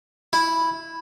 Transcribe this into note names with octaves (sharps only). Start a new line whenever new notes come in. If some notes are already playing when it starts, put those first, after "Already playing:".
E4